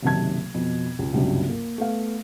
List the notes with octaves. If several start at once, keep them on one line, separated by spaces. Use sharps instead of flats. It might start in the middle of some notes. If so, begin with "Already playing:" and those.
F#1 B1 C3 D#3 A5 G#6
F2 B2
C#2
F#1 C#2 G2 C3 F#3
A#3
A3 B3 F5